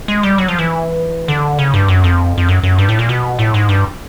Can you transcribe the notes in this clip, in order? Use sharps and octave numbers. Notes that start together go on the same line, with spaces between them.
G#3
G3
F#3
F3
E3
D3
C#3
G2
F#2
F2
F2
F#2
F#2
G2
A2
A#2
B2
A2
G#2
G2